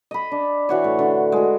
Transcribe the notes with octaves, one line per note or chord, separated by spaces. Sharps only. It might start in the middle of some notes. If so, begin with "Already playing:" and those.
D#5 B5
D4
E3 F#4 C#5
A2
D3
G#3 F#4